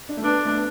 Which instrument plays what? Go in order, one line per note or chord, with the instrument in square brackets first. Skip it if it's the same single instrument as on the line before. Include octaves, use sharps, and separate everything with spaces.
[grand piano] D4
A3
[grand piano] B3 [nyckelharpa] D4
[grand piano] A3
B3